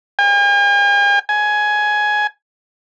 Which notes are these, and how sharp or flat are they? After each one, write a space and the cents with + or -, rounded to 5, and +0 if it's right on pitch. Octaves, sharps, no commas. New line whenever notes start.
G#5 -45
G#5 +15